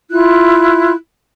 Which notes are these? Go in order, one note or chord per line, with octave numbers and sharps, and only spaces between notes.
E4 F4 F#6